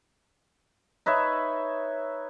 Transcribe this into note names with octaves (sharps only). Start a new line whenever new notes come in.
D#4 B4 C#5 E5